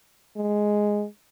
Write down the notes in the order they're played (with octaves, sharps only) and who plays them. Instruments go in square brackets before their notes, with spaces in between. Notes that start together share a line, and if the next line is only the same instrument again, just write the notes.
[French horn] G#3